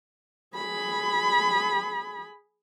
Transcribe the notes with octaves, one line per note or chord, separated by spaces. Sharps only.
G#4 B5